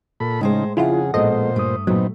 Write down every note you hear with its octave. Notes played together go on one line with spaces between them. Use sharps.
A#2 A4 B5
A2 C#3 G#3 D#4 C5
F2 C#3 E4 F4 G#4 F#5
A1 A#2 G#3 B3 A4 C5 D#5
G2 A3 D#6
A#2 F#3 A3 B3 C4 D#4